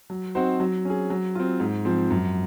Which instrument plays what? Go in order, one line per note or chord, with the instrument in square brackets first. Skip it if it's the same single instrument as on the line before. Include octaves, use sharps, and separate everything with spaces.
[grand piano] F#3
C4 D#4 F#4 C5
F#3
C#4 G#4
F#3
C4 F4
G#2
F3 C4
F#2